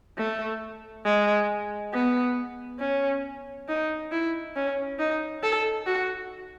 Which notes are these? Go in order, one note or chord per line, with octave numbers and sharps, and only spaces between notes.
A3
G#3
B3
C#4
D#4
E4
C#4
D#4
A4
F#4